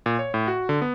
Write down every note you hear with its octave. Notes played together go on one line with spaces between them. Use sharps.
A#2
C#5
A2
F#4
D3
B3